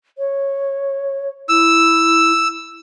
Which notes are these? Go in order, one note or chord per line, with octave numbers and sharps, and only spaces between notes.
C#5
E4 E6